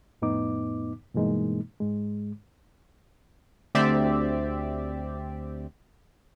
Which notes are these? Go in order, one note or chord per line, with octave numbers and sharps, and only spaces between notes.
F2 A2 B3 D#4 D6
G2 B2 E3 G#3 A#3 D#4
G#2 G#3
D2 C4 G4 D5 E5